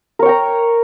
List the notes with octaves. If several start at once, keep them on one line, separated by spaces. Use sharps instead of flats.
A#4 C#5 G5 A#5